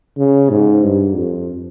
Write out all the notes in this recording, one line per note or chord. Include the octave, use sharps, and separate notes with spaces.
C#3
G#2
G2
F2